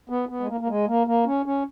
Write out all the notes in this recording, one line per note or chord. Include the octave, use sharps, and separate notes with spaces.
B3
B3
G#3
A#3
A#3
G#3
A#3
A#3
C#4
C#4